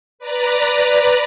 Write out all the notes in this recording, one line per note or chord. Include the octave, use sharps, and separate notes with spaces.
B4 D5 A#5